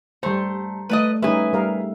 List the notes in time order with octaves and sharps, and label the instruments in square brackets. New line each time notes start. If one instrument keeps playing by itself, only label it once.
[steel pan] G3 C5 [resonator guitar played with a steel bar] A3 [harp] A#5 C6 G6
[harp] A3 [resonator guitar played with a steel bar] B4 D5 D#5
[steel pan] G3 C#4 D#4 [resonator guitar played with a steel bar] G#4 B4 [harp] E5
[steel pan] G3 A#4 F5